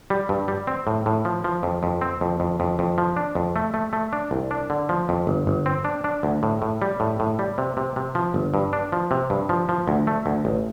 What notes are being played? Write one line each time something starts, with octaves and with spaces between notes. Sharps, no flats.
G3
G2
G3
C4
A2
A2
F3
F3
F2
F2
C4
F2
F2
F2
F2
F3
D4
F2
A3
A3
A3
D4
C2
D4
D3
F3
F2
G1
G1
C4
D4
D4
D2
A2
A2
G3
A2
A2
G3
C3
C3
C3
F3
G1
G2
D4
F3
C3
G2
F3
F3
D2
A3
D2
A1